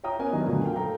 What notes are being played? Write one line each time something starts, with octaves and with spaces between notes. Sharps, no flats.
C#5 E5 G5 A#5 D#6
B3 C#4 A#4 C#5 G#5
D#3 F#3 G3 B3 D4 D#5
A#2 D3 F#3 A3
A#4 F5 G5
A4 F5 G5 A#5